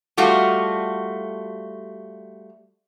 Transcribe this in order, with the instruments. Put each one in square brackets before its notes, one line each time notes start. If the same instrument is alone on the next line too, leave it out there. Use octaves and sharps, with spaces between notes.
[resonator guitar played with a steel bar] G3 A3 F4 F#4